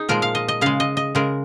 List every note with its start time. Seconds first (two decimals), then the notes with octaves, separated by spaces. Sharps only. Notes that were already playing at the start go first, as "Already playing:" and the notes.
Already playing: D#4 G#4
0.09 A#2 F3 G#3 A#4
0.22 F5
0.35 D#5
0.48 D#5
0.61 C#3 G#3 F5
0.80 D#5
0.97 D#5
1.15 C#3 G#3 A#4